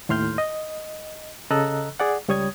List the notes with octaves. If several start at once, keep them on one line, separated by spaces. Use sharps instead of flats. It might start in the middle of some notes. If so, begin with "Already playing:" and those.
D#2 A2 C6 F6 G6
D#5
C#3 A4 D#5 A#5 E6 F#6
G#4 D5 F#5
C#2 G3 C#5 D#6 G#6